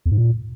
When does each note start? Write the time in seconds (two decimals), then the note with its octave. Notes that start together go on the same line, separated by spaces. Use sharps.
0.06 E2
0.11 G#2
0.17 A#2